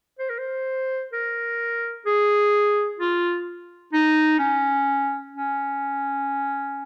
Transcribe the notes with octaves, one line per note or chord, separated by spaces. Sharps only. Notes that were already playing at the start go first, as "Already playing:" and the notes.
C5
A#4
C5
A#4
G#4
F4
D#4
C#4
C#4